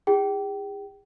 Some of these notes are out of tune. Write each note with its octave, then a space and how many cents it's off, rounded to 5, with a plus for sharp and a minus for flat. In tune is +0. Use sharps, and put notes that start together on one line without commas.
E4 +0 G#4 -40 G5 -25